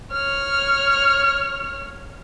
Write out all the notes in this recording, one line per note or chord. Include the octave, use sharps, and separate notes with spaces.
C#5 F6